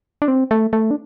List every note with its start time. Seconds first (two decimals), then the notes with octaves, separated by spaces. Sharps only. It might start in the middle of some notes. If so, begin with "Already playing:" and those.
0.22 D4
0.28 C4
0.51 A3
0.73 A3
0.91 D4